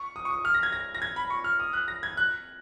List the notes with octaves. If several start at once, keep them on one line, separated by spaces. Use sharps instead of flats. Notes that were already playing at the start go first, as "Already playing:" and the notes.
Already playing: C#6
D#6
C#6
D#6
F6
A#6
G#6
A#6
A#6
G#6
B5
C#6
F6
D#6
F#6
A#6
G#6
F#6